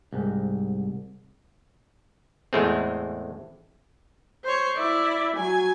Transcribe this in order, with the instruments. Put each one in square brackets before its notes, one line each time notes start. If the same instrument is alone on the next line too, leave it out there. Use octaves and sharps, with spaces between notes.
[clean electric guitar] C2 G#2
[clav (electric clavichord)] E2 A2 G#3 A3 C4
[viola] C5 C#5
E4 D5
F#3 G#5